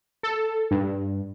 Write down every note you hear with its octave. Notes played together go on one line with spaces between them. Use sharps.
A4
G2